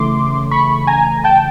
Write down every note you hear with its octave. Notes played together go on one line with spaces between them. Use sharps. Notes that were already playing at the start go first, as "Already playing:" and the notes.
Already playing: C#3 E3 A3 C6 D6
B5 C#6
G#5 A#5
G5 A5